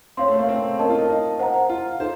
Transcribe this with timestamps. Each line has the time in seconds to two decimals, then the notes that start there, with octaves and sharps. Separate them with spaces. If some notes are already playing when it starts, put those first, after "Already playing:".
0.17 C4 C#5 F5 C6
0.28 A3
0.39 A#3
0.49 C4
0.78 C#4 A#4 D#5 A5
0.89 F4
0.99 D#4
1.09 D#4
1.39 C5 F#5 A#5
1.69 F4
2.00 D#4 A4 C5